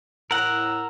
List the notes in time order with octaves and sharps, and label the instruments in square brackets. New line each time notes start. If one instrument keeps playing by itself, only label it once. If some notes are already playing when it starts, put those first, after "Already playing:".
[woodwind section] A2 A#5 E6 [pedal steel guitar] A#4 F#5